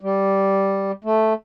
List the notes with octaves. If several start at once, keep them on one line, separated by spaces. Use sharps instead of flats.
G3
A3